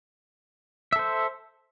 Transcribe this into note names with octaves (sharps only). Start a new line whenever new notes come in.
A4 C5 E5